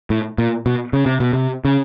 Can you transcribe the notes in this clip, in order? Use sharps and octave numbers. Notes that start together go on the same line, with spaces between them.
A2
A#2
B2
C#3
C3
B2
C3
C#3